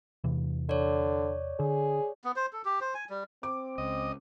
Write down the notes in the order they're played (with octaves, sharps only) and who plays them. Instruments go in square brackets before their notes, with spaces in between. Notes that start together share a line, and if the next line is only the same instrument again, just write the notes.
[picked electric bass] E2 C3 E3
[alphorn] D3 [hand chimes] C#5 D5
[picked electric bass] D3 [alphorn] G#4
[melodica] B3
C5
A4
G4
C5
G#5
G3
[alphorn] C4 [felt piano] D6
[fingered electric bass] C#2 [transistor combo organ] D#5